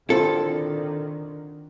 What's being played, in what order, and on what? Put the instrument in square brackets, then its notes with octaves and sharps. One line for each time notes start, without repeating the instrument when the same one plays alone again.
[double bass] D3 D#3 [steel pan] C4 E4 F4 [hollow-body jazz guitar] A4